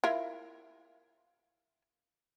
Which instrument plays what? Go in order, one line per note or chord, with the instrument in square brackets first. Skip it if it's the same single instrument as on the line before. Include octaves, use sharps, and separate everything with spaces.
[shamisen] E4 F4 A#4